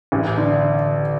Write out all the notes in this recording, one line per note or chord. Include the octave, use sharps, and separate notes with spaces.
A1
D3